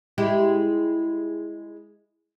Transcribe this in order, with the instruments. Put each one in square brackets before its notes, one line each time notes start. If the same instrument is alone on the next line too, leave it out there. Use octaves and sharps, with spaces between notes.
[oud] G#3 E4 G4